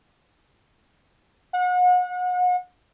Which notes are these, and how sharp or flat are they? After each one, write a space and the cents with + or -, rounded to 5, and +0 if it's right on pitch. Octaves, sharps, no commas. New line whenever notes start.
F#5 -35